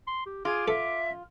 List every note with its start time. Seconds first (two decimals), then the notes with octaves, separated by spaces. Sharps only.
0.07 C6
0.26 G4
0.45 F4 G#4 D6
0.68 A4 E5